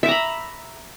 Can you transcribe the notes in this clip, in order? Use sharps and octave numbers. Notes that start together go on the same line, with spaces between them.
E5 A#5 B5 D6